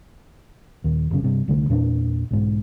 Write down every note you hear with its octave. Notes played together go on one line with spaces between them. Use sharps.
D#1 D#2
G1 F#2 C#3
G2 C3
C2 D3 A3
E2 A#2 C#4 D4
B1 G#2